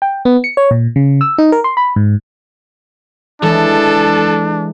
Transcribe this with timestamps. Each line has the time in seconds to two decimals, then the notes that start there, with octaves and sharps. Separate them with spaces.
0.02 G5
0.25 B3
0.44 C#7
0.57 C#5
0.71 A#2
0.96 C#3
1.21 E6
1.38 D#4
1.52 A#4
1.64 C6
1.77 B5
1.96 G#2
3.42 E3 G#3 D4 A4